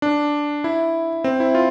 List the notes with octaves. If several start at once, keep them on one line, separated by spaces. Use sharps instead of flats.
D4
E4
C4
E4
F4